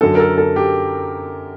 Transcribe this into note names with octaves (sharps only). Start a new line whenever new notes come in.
F#2 D3 F#3 A4
A#4
A4
A4
G4